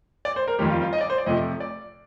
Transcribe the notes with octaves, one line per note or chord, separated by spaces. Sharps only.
D5
C5
A#4
F2 D#3 G3 G4
F4
F4
D#5
D5
C5
D5
F2 C3 F3 A3 D#5
D5